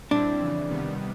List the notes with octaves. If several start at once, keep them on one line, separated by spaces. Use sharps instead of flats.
A#2 G3 C4 D4 E4
F2 C#3 E3
C3 D#3 G3 B3